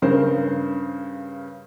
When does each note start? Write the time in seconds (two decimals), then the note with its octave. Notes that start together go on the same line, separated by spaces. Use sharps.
0.02 G2 C#3 A#4 C5